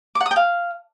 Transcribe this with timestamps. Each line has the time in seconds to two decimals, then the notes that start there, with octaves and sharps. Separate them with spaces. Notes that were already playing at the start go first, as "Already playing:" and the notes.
0.15 D6
0.20 F#5
0.26 D#6
0.31 G5
0.36 F5